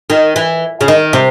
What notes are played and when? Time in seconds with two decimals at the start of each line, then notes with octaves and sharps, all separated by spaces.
0.10 D#3
0.36 E3
0.81 C#3
0.88 D#3
1.13 C3